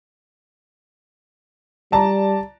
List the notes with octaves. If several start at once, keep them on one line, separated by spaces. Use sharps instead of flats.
G3 D5 A5 A#5